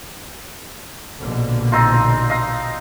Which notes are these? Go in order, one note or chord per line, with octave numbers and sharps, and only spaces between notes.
A#1 B2 D3
C4 D#4 F4
D#5 F5 A#5